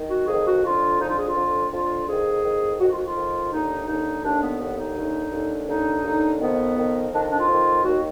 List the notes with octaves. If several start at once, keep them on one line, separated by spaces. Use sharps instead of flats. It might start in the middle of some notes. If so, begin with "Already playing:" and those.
Already playing: D#3
F#4
F2 D#3 G#4
F#4
F2 D3 F4
F2 D3 D#4
F4
G#4
F4
F2 D3
F2 D3 F4
F2 D#3 G#4
F2 D#3
F2 D#3 F#4
F4
F#4
F4
F2 D#3
D#2 D3 D#4
D#2 D3 D#4
D#2 D3 D4
B3
D#2 D3 B3
D#4
D#2 D3
D#2 D3
D#2 D3 D#4
D#2 D3
F2 D#3 B3
F2 D#3
F2 D#3 D4
D4
F4
F2
D#3
D#2 D#3 F#4